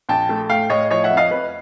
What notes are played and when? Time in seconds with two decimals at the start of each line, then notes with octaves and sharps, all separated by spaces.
0.09 A#1 G5 A5
0.29 A3
0.49 A2 F5 G5
0.70 A2 C#5 D#5
0.91 F3 C#5 D#5
1.04 E5 F#5
1.11 F2
1.17 D#5 F5
1.31 F2 B4